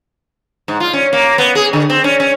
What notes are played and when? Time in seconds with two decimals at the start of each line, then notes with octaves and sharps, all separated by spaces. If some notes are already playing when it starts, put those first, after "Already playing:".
0.68 G#2
0.80 F4
0.93 C#4
1.13 A#3
1.38 B3
1.55 G#4
1.73 D3
1.90 C4
2.04 C#4
2.20 C#4